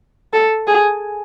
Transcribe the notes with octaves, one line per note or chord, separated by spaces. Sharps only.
A4
G#4